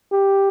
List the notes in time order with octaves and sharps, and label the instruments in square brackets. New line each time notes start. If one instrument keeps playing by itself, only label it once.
[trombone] G4